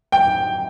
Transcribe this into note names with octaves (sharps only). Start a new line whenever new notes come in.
G5